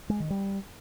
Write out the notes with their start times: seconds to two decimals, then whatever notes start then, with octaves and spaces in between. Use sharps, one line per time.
0.10 G#3
0.20 D#3
0.30 G3